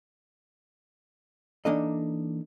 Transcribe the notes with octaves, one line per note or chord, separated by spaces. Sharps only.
E3 A#3 D4 D#4 A4 D#5